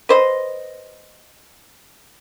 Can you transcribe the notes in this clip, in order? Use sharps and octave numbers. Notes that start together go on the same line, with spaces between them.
B4 C5 D#5